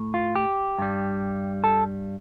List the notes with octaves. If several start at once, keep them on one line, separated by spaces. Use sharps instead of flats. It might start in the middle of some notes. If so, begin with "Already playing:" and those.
Already playing: A2 A3
F4
G4
G2 G3
A4